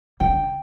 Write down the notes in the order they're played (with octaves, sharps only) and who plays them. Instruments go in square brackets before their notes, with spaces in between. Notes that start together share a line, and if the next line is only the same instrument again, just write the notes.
[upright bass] D3 [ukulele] G5